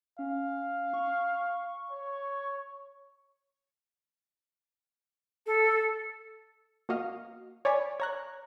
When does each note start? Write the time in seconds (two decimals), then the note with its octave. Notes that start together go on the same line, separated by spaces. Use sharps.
0.19 C#4 F5
0.93 C#6
1.91 C#5
5.46 A4
6.89 A#3 F#4 D#5 F5
7.65 C#5 D5 G#5 B5
8.00 C#5 A#5 F#6